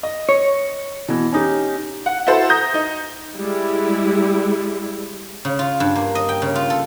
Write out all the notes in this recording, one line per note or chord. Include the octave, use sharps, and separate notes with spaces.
D#5
C#5
B2 E3
C#4 D#4 G4
F#5
E4 F#4 A4 C5
A#5 D#6 G6 A#6
D#4
G3 G#3 E4
C#3
F4
G2
A#3
D#5
G5
C#3
F4
A4